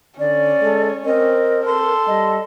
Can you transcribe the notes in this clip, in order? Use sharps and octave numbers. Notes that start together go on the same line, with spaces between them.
D3 C#4 D5
G#3 A4
C4 A#4 D#5
A4 C6
G3 D#5